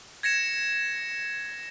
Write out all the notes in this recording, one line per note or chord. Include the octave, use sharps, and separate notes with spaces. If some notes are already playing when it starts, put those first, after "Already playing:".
G#6 A#6 C#7 E7